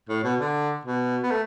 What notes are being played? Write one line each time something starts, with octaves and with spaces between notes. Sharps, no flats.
A2
B2
D3
B2
B3
A3